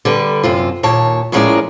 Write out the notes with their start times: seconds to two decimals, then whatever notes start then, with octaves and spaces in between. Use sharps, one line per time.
0.05 D3 G3 B4
0.43 F#2 C3 F4
0.83 D#2 A#2 C#5 A5
1.32 A2 F3 G#3 C#4 A#4 D5